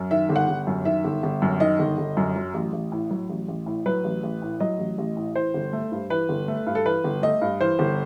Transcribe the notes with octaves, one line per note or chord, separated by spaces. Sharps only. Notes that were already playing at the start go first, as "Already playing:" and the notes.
Already playing: F#2
D#3 E5
G1
F#5
G1
F#2
D#3 E5
G1
G1
F#2
D#3 D#5
G1
G1
F#2
F#3
A1
A1
A2
F#3
A1
A1
A2
F#3 B4
A1
A1
A2
F#3 D#5
A1
A1
A2
E3 C5
G1
A3
G2
E3 B4
G1
A3
G2
A4
E3 B4
G1
A3 D#5
G2
E3 C5
G1